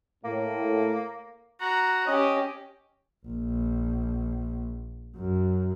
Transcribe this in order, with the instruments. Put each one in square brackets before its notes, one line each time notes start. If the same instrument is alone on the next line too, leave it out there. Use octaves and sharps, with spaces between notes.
[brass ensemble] A2 [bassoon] A#3
[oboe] F#4 [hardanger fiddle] A#5
[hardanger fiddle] C#4 G4 [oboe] D#5
[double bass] A#1
F#2